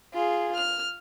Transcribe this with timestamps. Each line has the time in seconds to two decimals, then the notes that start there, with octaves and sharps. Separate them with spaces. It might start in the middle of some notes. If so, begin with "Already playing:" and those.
0.13 F4 G#4
0.55 F6